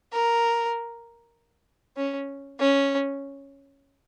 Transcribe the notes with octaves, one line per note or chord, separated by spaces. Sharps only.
A#4
C#4
C#4